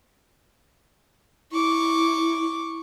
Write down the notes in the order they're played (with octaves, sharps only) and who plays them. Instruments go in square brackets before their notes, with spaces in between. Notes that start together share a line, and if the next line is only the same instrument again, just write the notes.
[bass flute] E4 [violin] C#6 D6